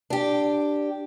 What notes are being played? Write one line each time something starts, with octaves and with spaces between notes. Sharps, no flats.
D4 G4